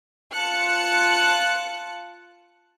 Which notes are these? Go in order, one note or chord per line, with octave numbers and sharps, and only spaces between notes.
F4 A5 F#6 C#7